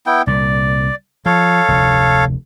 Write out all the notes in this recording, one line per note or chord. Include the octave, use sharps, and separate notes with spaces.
B3 E4 G5
C2 A#2 D5
F3 A4 C#5 F5
F1 D2